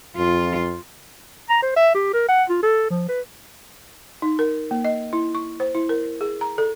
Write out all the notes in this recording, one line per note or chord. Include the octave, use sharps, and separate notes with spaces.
F2 F4
A#5
C5
E5
G4
A#4
F#5
F4
A4
F3
B4
D#4
A#4
A#3
D#5
E4
C#6
C5
E4
A#4
G#4
A#5
A4